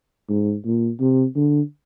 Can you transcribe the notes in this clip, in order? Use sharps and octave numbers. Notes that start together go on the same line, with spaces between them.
G#2
A#2
C3
D3